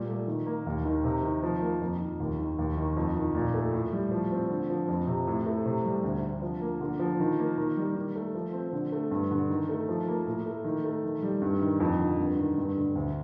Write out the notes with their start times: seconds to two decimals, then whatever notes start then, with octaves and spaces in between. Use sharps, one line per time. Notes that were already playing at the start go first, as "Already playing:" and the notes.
Already playing: A#2 G3
0.08 A3
0.27 D#3
0.46 A#3
0.66 D#2
0.85 D#3
1.04 C3
1.23 D#3
1.43 F3
1.62 A#3
1.81 F2
2.00 D#3
2.20 D#2
2.39 D#3
2.59 D#2
2.77 D#3
2.97 F2
3.16 D#3
3.35 A#2
3.54 A3
3.73 A2
3.93 G3
4.11 F3
4.31 C4
4.50 D3
4.70 F3
4.88 F2
5.07 C3
5.27 A2
5.46 A3
5.66 C3
5.85 G3
6.04 D2
6.23 D3
6.42 F3
6.62 A#3
6.81 D3
6.99 F3
7.20 D#3
7.39 A#3
7.58 D#3
7.77 G3
7.96 D#3
8.16 A3
8.35 F3
8.53 C4
8.73 D3
8.92 A3
9.11 G2
9.31 D3
9.50 D#3
9.69 A3
9.88 F3
10.08 A#3
10.27 A2
10.46 A3
10.64 D#3
10.84 A3
11.04 D#3
11.22 G3
11.42 G2
11.62 D#3
11.80 F2
12.00 D3
12.19 G2
12.38 D#3
12.58 G2
12.77 D3
12.95 D2